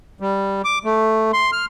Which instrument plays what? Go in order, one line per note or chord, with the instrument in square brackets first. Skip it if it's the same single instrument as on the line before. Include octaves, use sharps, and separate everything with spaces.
[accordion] G3
D6
A3
C6
F6